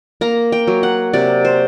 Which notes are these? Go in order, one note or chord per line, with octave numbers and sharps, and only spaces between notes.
A#3 A#5
G5
F#3
F#5
C3 D5
C5